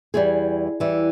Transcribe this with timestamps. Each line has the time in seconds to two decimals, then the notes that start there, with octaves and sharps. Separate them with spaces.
0.14 E2 E3 G3 G#4
0.80 E2 E3 G3